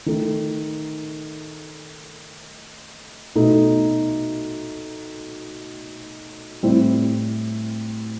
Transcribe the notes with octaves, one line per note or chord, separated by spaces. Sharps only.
D#3 A3 D#4
B2 A3 D#4
A2 G3 C4 E4